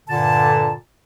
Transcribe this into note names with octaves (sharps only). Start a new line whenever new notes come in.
G2 A#2 D3 A5